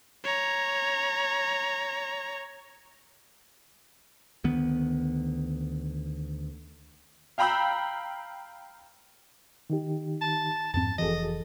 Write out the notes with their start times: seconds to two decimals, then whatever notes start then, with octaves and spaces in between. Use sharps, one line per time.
0.24 C#5 A#5
4.44 D2 D#3 B3
7.38 F5 G5 A#5 B5 E6 G6
9.70 D#3 D#4 G4
10.21 A5
10.74 F2 G#2 C4 A5
10.98 F1 E3 F#4 G#4 A4 D#5